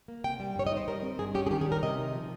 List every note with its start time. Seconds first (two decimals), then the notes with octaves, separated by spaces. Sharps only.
0.08 A#3
0.24 C3 G5
0.40 G3
0.56 G2 C#5
0.67 D#5
0.72 D#4
0.77 C5
0.88 G3 A#4
1.03 C4
1.19 G2 G#4
1.35 C#4 G4
1.47 G#4
1.51 D#3 G4
1.61 G#4
1.66 G3
1.72 A#4
1.83 C3 D#5
1.98 D#4
2.14 F3